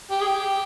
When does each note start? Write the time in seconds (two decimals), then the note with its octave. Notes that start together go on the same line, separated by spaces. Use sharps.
0.11 G4
0.21 G#4
0.27 G4